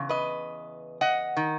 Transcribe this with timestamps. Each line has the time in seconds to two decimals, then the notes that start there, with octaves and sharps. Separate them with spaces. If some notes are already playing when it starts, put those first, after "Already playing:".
Already playing: E2 C#3
0.09 B4 D#5
1.01 D#5 F#5
1.37 D#3